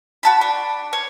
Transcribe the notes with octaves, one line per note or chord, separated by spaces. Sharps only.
F#4 A5 B5
D4
C#5